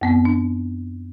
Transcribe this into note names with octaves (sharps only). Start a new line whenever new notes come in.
F#2 B3 C4
D4